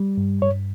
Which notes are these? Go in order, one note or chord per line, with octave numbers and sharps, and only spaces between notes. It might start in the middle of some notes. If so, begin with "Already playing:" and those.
Already playing: G3
G2
G2 C#5